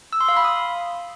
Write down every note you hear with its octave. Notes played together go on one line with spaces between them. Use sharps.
E6
C6
F5
B5
D#6